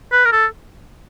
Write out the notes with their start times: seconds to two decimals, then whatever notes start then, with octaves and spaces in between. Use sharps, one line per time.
0.12 B4
0.25 A#4
0.32 A4